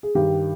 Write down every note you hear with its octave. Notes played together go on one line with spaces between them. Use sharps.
G#4
G2 D#3 G4